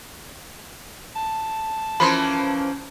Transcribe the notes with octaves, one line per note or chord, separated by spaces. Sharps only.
A5
E3 F3 A#3 C#4 B5 C6